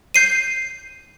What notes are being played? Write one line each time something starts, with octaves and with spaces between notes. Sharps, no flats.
G6 C7 D#7